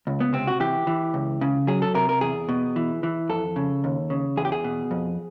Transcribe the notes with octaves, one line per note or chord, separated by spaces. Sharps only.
C#2
B3
C3 C4
F#4
E3 G4
E3
C#2
C#3
F#3 G#4
A4
C3 A#4
A#4
E2 G#4
B2
E3
E3
F2 A4
C#3
D#2
C#3
E2 G#4
G4
G#4
B2
F2